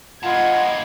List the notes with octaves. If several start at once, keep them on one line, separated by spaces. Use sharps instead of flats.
G2 A#3 F4 D#5 F#5 G#6